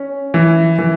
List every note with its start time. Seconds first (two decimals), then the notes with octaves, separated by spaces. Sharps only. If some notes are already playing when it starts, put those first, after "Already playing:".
Already playing: C#4
0.34 E3
0.79 E3